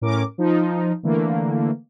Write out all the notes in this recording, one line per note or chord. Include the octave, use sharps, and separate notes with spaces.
A2 C#4 A#4 D6
F3 D#4
D3 E3 A3 A#3